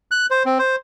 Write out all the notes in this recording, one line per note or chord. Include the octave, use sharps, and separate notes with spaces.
F#6
C5
C4
C5